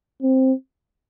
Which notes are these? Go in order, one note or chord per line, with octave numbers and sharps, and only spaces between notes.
C4